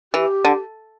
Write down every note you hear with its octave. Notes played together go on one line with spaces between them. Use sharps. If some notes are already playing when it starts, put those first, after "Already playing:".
E3 G4
D3